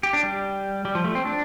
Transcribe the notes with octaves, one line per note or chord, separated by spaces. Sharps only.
G4
D4
G3
G3
F3
A3
C4
D4